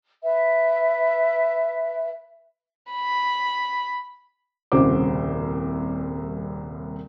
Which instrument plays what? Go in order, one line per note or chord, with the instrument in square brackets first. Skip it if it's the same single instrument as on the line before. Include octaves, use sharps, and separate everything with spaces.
[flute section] B4 E5
[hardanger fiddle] B5
[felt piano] D#1 C2 C#3 F#4 C5 D6